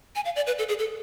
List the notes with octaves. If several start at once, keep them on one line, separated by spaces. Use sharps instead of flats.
G#5
F5
D5
B4
A4
G#4
A4